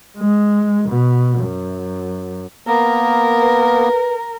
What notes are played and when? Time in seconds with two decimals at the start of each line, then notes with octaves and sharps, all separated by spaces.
0.18 G#3
0.89 B2
1.41 F#2
2.67 A#3 B3 A#4
3.40 B4